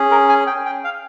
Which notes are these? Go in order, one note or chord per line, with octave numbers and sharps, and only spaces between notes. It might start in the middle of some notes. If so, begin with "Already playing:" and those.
Already playing: C#4 G#4
A#4
G#5
G5
G5
F5